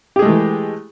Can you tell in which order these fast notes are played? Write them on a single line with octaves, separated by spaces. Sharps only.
G4 G#4 G#3 A3 E3